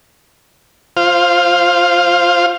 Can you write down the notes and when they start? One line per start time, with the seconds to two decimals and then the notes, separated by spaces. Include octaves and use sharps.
0.97 F4 C5 F5